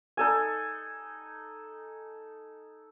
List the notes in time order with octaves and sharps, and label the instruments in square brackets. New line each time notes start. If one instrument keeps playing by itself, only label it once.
[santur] D#4 A4 G#5